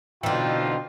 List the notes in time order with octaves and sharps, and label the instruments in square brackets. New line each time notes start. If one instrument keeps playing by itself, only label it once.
[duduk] B2 [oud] D3 E3 [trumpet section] C4 D#4 F4 [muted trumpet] G5